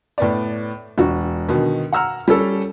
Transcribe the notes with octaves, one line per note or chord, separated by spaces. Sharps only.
A2 B3 D5
E1 F#4
B2 D3 D#3
F#5 A#5 E6 F6
G3 C#4 A4